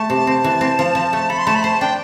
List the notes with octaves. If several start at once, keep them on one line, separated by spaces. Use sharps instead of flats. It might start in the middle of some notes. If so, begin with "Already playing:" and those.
Already playing: A3 A5
C3
C4
E3
C4
F3
F3
A3
A4 B5
C6
A3 A5
B5
C5 A5
D4 G5